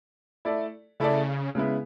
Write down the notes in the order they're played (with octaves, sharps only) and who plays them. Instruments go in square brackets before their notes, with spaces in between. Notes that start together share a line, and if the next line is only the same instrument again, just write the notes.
[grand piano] A3 E4 A4 D5
[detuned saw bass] C#3 [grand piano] A3 E4 A4 D5
[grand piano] C#3 G#3 B3 E4